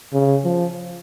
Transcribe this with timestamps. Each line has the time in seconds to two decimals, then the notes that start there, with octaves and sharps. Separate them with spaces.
0.13 C#3
0.45 F3